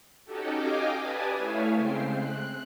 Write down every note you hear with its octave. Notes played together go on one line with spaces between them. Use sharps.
C#4 D#4 F#4 G4 A4
D#5 F5 G5 G#5 D6
G4 B4 D5 G#5 A5 D#6
A3 E4 C#5 E5 F5 G#5
C#3 G#3 C4 C5 G5 C7
F#6